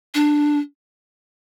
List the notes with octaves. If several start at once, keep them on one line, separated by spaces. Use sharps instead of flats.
D4